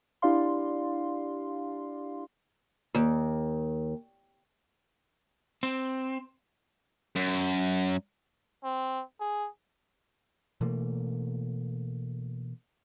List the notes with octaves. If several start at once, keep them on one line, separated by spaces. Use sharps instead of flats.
D4 E4 G4 D5 F5 C6
D#2
C4
F#2
C4
G#4
B2 E3 A3 A#3